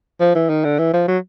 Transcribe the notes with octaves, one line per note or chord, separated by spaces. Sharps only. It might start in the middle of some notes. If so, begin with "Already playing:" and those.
F3
E3
D#3
D3
E3
F3
F#3